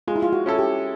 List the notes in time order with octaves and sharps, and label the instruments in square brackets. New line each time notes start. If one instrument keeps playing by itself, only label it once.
[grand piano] G#3 [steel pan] F4
[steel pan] E4
F4
F#4
[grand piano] C#4 E4 A4
[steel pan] G4